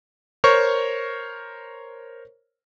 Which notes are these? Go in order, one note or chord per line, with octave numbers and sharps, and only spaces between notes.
A#4 C5 C#5 C#6